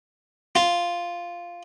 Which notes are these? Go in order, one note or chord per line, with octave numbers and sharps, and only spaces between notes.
F4